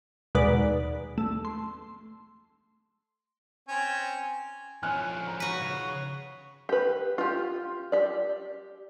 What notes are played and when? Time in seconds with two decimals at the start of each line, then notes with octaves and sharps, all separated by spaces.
0.35 D#2 B2 G#3 B4 D5
1.18 A3
1.45 C6
3.68 C4 C#4
4.83 F3 C#4 G#5 F6 F#6
5.27 A#5
5.40 F#4 B4
5.61 C#3
6.69 G4 B4
7.18 F4 G4
7.92 G4 D5